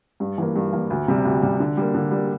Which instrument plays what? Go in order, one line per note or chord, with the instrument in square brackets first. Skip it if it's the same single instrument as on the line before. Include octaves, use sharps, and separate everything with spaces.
[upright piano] G2
E3 A#3
G2
E3 A#3
D2
C3 G3
D2
C3 G3
D3
G3 A#3
D3
G3 A#3